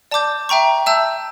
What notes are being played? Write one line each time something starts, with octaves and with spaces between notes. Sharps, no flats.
D5 A5 D6 G6
E5 G5 A#5 C#6
E5 A5 E6 G6